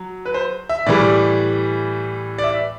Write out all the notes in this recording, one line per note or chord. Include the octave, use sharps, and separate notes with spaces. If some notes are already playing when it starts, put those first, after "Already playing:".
Already playing: F#3
B4
C5
E5
A2 E3 G3 D5
D5
E5